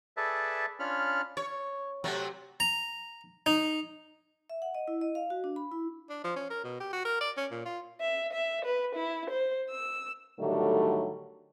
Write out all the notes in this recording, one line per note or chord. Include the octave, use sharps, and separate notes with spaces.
G#4 A4 B4 D5 E5 A5
C#4 D4 F4 C#5 B5 F6
C#5
C3 F#3 A3
A#5
D#4
E5
F#5
D#5
E4
D#5
F5
F#4
D4
B5
E4
D4
F3
C#4
A#4
B2
G4
F#4
A#4
D5
C#4
A#2
F4
E5
E5
B4
E4
C5
E6
A2 D3 D#3 F#3 G3 A3